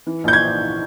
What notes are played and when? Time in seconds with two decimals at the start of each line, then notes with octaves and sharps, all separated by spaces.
0.07 E3
0.24 A#1 G6
0.33 G#6